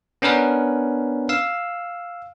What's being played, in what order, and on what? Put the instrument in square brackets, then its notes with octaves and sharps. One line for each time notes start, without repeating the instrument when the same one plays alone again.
[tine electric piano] B3 C#4 D4 A#4 B4
F5 E6